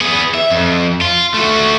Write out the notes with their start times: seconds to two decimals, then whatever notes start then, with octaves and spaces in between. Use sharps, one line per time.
0.01 B3 G#4
0.34 E5
0.50 F2
1.01 F4
1.34 A3 F#4